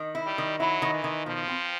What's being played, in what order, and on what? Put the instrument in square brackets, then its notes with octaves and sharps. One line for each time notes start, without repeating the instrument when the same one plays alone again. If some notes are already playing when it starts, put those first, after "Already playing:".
Already playing: [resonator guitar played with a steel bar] D#3
E4
[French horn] G3
[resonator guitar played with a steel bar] D#3
[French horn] F#3 [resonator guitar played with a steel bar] E4
[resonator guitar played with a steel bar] D#3
[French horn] E3
[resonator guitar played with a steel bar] D#3
[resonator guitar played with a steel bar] B2 [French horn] F3
[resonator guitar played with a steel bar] C4